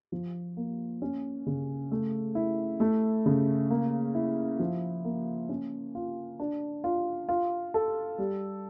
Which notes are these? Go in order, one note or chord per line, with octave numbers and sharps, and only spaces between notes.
F3
A#3
C#4
C#3
A3
E4
A3
C#3
A#3
E4
F3
A#3
C#4
F4
D4
F4
F4
A4
G3